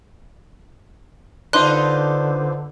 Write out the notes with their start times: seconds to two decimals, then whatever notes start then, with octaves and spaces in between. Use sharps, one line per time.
1.53 D3 D4 D#4 F4 B4 C5 C6 F#6